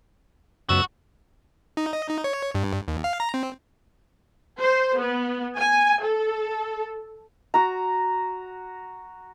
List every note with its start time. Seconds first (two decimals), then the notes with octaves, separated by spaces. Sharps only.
0.69 C#2 F#2 F#3 B3 F#4 E6
1.77 D#4
1.93 D#5
2.09 D#4
2.24 C#5
2.55 G2
2.88 D#2
3.04 F5
3.20 A#5
3.34 C4
4.59 C5
4.98 B3
5.57 G#5
6.03 A4
7.54 F#4 A#5